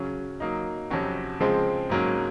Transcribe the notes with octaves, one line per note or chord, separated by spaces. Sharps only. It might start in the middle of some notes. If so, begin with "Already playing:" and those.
Already playing: C#3 F#3 C#4
F#3 A#3 D#4
F2 C3 F#3 C#4 F#4
C#3 F3 G#3 C4
G#2 F#3 A#3 C#4